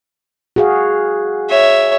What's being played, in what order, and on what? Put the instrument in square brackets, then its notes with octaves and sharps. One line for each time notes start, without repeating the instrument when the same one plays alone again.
[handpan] F#4 G#4 F5
[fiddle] C#5 E5